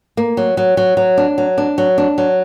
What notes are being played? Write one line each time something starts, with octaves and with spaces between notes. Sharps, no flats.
A#3
F#3
F#3
F#3
F#3
D4
F#3
D4
F#3
D4
F#3